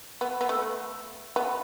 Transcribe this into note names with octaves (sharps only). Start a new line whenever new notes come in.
B3
B3
A3
B3